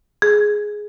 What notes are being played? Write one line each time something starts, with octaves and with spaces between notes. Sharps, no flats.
G#4